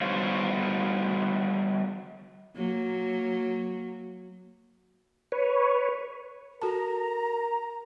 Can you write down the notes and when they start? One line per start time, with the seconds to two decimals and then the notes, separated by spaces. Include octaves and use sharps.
0.01 G3 B3 F#4 C5 C#5 F5
2.56 F#3 A#3
5.32 B4 C#5
6.62 F#4 A4 A#4 A5 A#5